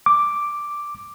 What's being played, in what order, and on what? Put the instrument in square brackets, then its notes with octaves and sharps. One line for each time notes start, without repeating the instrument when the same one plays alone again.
[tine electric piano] D6